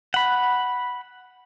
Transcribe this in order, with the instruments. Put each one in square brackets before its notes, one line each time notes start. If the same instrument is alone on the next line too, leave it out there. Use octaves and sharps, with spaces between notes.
[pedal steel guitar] F#5 B5